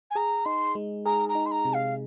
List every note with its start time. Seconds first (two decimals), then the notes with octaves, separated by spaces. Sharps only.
0.10 G#5
0.15 G#4 A#5
0.45 D#4 C6
0.75 G#3
1.05 G#4 A#5
1.28 A#5
1.35 D#4
1.45 C6
1.51 A#5
1.65 C3
1.73 F5